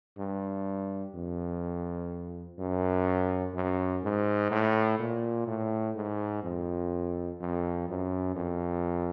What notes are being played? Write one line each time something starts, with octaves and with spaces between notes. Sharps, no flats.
G2
F2
F#2
F#2
G#2
A2
A#2
A2
G#2
F2
F2
F#2
F2